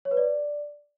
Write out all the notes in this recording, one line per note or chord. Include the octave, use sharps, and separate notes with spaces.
C#5
B4
D5